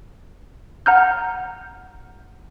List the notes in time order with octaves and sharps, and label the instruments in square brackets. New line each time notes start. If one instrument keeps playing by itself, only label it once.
[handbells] F#5 A#5 F6 G6